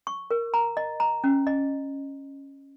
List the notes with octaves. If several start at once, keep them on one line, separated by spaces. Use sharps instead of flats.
C#6
A#4
A#5
D#5
A#5
C#4
D#5